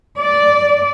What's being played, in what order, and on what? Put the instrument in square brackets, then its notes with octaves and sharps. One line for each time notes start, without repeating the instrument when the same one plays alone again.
[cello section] D5